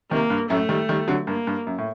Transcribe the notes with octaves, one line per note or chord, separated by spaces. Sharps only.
C3 D#3 A#3
G2
F#2 A2 A3
D#3 G3
D#3 G3
D3 F#3
G2 A#3
G2
F#2
A2